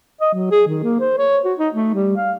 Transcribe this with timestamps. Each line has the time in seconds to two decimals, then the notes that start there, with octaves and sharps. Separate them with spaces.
0.21 D#5
0.33 F#3
0.51 G#4
0.67 D#3
0.83 A#3
1.00 C5
1.18 C#5
1.45 F#4
1.59 D#4
1.74 A3
1.94 G3
2.17 F5